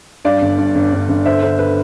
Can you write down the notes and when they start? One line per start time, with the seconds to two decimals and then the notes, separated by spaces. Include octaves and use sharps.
0.25 G2 D5 F5
0.42 G1
0.58 G2
0.75 G1
0.93 G1
1.09 G1
1.25 D3 C5 E5
1.42 D3 C5
1.59 B4